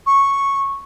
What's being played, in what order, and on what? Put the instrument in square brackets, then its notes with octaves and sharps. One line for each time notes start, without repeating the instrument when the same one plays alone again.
[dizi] C#6